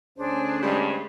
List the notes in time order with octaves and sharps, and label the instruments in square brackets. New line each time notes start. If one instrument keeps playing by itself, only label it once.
[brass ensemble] D2 C#4 [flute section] D4 G#4 C5
[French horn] G2 [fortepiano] G3 G#3